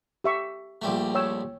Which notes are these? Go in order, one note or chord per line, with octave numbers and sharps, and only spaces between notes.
G4 E5 C#6
A#1 G3 A3
C#5 G5 E6